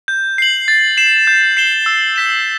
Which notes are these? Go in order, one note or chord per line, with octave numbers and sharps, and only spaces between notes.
G6
C7 F#7
A6
C7 E7
G6
C7 E7 G7
E6
G6 B6 E7